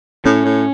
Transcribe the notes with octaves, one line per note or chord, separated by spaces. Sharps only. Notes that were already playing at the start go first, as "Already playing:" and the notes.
A2 C#4
A2